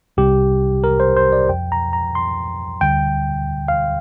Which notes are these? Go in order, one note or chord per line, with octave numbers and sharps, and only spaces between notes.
C2 C3 G3 G4
A#4
C5
C5
D5
F2 F3 G5
A#5
A#5
C6
D2 D3 G3 G5
F5